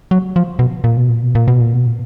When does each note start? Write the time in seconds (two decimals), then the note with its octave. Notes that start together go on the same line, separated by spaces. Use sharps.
0.11 F#3
0.36 F3
0.59 B2
0.84 A#2
0.97 B2
1.09 A#2
1.23 B2
1.35 A#2
1.48 B2
1.61 A#2
1.74 B2
1.86 A#2